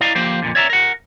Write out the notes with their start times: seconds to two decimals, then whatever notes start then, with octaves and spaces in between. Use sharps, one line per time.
0.01 E4 D5 D#5 F5 A#5
0.15 D3 F3 A#3 G4 C5
0.42 F2 A#2 D3
0.55 C#5 D5 E5 A5 A#5
0.70 A#4 F#5